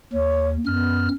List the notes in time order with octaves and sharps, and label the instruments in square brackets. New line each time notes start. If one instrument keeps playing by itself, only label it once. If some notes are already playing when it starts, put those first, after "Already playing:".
[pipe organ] D#2 [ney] C#5
[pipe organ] F#2 F6 [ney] B3